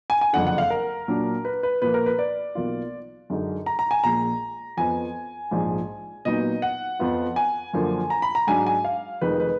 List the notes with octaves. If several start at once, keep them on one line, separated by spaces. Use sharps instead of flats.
G#5
G#5
F#1 F2 D3 F#5
F#5
F5
A#4
A#2 F#3 D4
B4
B4
A#2 F3 A#3 B4
A#4
B4
D5
B1 B2 A#3 F4
F#2 D3 G#3 D#4
A#5
A#5
G#5
A#1 A#2 G#3 A#5
F2 F3 B3 G#5
A#1 G#2 F3
A#2 F#3 B3 D#4 D#5
F#5
F2 F3 B3 F4
G#5
F#2 D3 F3 A#3
A#5
B5
A#5
G#2 F#3 D4 G#5
G#5
F5
F1 F2 D#3 G#3 D#4 B4
B4